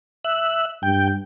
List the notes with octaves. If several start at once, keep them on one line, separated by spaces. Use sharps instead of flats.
E5 F#6
G2 G5